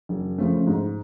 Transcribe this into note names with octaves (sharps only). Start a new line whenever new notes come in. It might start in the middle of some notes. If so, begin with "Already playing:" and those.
F#1
F2 C#3 F3 A3
G#2